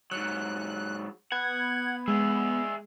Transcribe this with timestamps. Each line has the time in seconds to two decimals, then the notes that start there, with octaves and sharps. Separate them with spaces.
0.11 G#2 F#3 F#6
1.32 B3 F#5 G#6
2.08 G#3 G#4 E5